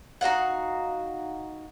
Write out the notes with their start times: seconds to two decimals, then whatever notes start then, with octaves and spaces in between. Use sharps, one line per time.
0.21 D#4 F#4 F5 F#5